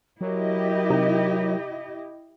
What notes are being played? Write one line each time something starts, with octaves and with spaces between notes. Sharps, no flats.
F#3 E4 G4 A#4 D#5
C3 D#4